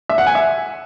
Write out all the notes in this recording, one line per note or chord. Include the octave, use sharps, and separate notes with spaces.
E5
F#5
G#5
E5